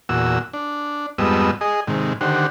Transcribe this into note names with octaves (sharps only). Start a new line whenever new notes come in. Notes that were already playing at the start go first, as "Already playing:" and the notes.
E2 A#2 F#4 E6
D4
F2 G#2 G3 B3 D#5 E6
G#4 D#5
G#2 C3 D#3
D3 D#3 G4 C5 F#5